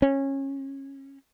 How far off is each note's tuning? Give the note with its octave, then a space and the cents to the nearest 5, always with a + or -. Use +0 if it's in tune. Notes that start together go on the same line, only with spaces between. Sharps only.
C#4 -20